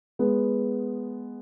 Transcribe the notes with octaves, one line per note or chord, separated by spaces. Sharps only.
G#3 B3